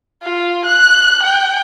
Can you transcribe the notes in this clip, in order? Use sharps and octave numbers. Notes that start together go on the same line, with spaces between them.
F4
F#6
G5